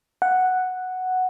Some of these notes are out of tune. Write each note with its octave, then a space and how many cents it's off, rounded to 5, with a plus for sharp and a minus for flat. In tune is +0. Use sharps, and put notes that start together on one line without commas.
F#5 +0